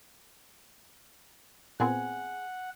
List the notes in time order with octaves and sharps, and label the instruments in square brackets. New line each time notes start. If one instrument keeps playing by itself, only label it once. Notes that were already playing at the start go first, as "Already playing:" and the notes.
[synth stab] A#2 B3 C4 [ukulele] G#4 [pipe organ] F#5